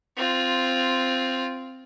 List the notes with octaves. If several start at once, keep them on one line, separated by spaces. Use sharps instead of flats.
C4 F4